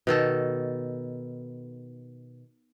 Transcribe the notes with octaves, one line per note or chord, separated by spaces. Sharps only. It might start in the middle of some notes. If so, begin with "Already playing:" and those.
B2 D#3 A4